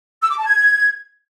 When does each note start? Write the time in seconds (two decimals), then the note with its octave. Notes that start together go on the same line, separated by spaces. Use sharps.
0.22 E6
0.30 D6
0.39 A5
0.47 G#6